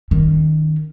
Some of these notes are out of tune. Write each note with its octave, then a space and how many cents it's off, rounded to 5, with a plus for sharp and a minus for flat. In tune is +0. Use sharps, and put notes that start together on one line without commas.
D#3 -5 C#4 +0